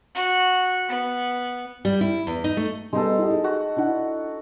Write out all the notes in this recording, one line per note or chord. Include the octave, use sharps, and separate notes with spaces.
F#4
B3
G3
E4
E2
D#4
A3
G3 G#3 B3 D#4 A4
E4 G4 D#5
D#4 G#4
F#4
D4 E4 F#5